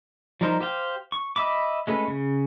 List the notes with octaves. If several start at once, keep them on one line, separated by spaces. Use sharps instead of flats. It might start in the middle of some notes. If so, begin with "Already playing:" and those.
F3 G3 D#4 A#4 C5
G4 C5 F5 G5
C#6
D#5 E5 B5 D6
G#3 A3 C#4 B4
C#3